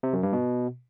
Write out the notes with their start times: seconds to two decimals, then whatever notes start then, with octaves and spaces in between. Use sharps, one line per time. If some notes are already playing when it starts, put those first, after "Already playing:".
0.03 C3
0.13 F#2
0.23 G2
0.33 B2